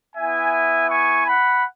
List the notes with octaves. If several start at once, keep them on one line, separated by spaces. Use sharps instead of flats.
B3 E4 E5 G#5
G#5 C#6
F#5 B5